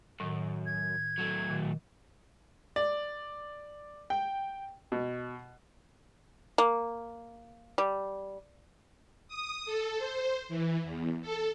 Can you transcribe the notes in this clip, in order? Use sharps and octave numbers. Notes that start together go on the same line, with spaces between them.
F#2 A2 D#3
G#6
F#3 A3
A#2 D#3
D5
G5
B2
A#3
G3
D#6
A4
C5
E3
E2
A4